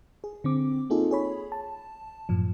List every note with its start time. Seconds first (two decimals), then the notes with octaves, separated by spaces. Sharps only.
0.24 G#4
0.44 D3 C4 D6
0.90 A#3 C4 D#4 F4 G#4 A4
1.11 G#4 C#5 B5
1.52 A5
2.29 F#2 A2 F3